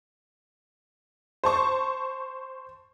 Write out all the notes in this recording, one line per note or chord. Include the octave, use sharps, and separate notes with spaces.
C5 A5 C#6